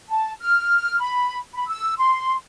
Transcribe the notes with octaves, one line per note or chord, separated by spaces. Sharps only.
A5
F6
B5
B5
E6
C6